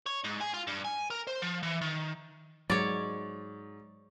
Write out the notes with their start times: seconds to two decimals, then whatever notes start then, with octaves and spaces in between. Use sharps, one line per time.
0.07 C#5
0.24 G#2
0.41 G#4
0.54 F4
0.67 G2
0.85 G#5
1.10 A#4
1.27 C5
1.42 F3
1.63 E3
1.81 D#3
2.70 G#2 F#3 C#5 D5